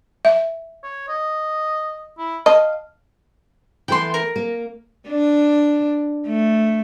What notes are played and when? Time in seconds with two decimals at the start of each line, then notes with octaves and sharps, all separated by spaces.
0.25 E5
0.84 C#5
1.09 D#5
2.18 E4
2.46 D#5 F5 A5
3.88 E3 A3 B3 G5 C6
4.14 A#4
4.36 A#3
5.08 D4
6.27 A3